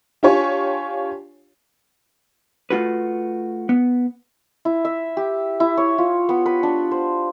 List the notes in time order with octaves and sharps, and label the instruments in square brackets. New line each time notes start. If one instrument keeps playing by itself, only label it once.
[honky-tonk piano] D4 F4 G4 C#5 G#5
[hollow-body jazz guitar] A3 F4 F#4 B4
B3
[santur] E4
E5
G4
E4
C#5
F4
B3
B4
D4
C5